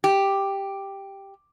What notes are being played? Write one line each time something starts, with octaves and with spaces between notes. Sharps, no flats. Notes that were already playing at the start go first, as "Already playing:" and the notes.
G4